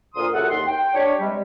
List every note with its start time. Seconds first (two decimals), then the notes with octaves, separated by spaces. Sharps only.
0.15 D2 A#2 A#4 C6 D#6
0.32 C#2 F#2 C3 A4 F#5
0.50 D#2 C6
0.66 G5
0.93 D4 G4 C#5
1.20 C3 G3 G#3